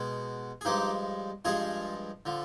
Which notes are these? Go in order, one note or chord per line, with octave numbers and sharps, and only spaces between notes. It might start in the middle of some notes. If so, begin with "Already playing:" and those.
Already playing: B2 G#3
G#4
G2 F3 G#3 D#4 G4
G2 F3 G#3 F4 G#4
D3 F3